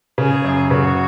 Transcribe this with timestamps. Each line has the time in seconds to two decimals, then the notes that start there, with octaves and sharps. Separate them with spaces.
0.18 C#3 G#4
0.44 F#2
0.71 C#3 F#4